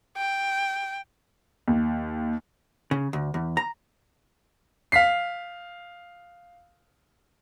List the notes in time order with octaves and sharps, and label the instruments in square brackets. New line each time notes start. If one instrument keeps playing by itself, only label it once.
[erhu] G5
[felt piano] D#2
[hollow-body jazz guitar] C#3
D2
E2
A#5
[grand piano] F5 B6 C7